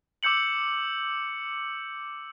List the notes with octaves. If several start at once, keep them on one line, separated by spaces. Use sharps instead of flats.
D6 E6 G6 C#7 F#7